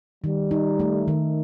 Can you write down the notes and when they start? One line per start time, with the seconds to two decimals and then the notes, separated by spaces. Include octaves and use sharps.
0.24 D#3 G3
0.51 D#4
0.79 A3
1.08 D#3